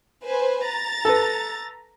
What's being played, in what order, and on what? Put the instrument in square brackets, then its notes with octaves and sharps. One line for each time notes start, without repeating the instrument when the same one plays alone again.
[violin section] B4 C5 G#5
A#5 A6
[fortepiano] A4 B4